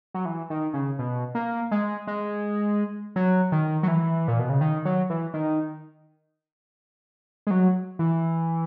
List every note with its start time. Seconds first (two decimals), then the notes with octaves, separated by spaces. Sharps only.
0.14 F#3
0.25 E3
0.50 D#3
0.74 C#3
0.99 B2
1.35 A#3
1.71 G#3
2.07 G#3
3.16 F#3
3.52 D#3
3.83 F#3
3.88 E3
4.28 A#2
4.39 B2
4.49 C#3
4.61 D#3
4.85 F#3
5.10 E3
5.34 D#3
7.47 G#3
7.51 F#3
7.99 E3